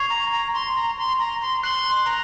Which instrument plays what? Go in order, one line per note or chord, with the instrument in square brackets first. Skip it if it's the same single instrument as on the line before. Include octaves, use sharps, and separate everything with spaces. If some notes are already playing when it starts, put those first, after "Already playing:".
Already playing: [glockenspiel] C#6 G#6 C7 F7
[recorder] A#5
A#5
C6
A#5
C6
A#5
C6
[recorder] C6 [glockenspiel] F#6 C7 F#7
[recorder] A#5